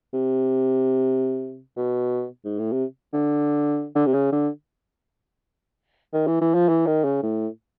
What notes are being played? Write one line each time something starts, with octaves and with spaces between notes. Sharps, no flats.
C3
B2
G#2
A2
C3
D3
D3
C3
C#3
D3
D#3
E3
E3
F3
E3
D#3
C#3
A2